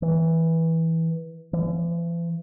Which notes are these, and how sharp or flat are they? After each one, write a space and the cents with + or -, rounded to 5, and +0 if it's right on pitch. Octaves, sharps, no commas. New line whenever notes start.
E3 -15
E3 +45